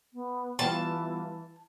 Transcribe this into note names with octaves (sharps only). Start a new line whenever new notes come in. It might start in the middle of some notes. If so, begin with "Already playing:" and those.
B3
E3 G3 B3 F4 A5